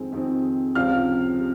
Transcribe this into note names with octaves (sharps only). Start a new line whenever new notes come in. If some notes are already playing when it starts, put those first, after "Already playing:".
Already playing: F2 D#3 G#3 C4
F2 D#3 G#3 C4
C#2 C3 F3 C4 F5 F6
C3